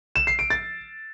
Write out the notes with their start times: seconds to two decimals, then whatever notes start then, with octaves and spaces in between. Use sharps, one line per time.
0.16 E7
0.27 C7
0.39 D7
0.50 A6